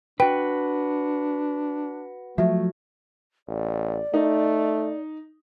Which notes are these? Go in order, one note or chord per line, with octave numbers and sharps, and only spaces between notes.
D4 F#4 B4 G5
F3 F#3 A3 E5
A1 D5
A3 D#4